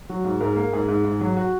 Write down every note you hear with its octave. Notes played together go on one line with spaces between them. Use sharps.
F#3 F#4
G#2
G#2 A#4
A#3
G#2 G#4
G#2
G#2
F#3
F#4